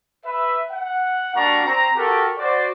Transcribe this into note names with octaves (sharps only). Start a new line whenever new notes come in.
B4 E5
F#5
G3 A#3 D4 F#4 A#5 C#6
C4 A#5
F#4 G4 A4 A#4
F#4 C5 D5